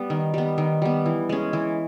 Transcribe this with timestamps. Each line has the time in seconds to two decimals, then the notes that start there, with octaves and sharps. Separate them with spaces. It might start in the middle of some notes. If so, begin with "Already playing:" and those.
Already playing: G3 B3
0.10 D#3
0.34 G3 B3
0.58 D#3
0.82 G3 B3
1.06 E3
1.29 G#3 C#4
1.53 E3